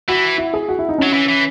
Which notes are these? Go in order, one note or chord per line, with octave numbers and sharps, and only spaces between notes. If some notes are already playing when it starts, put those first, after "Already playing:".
E3 F#4
E4
G#4
F#4
E4
D#4
F#3 C#4
E3
E3